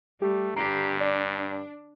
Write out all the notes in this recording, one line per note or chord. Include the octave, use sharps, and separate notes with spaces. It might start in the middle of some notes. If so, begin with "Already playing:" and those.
G3 A3 G4
G2 D3 G4 A#5 C7 D7
D4 D5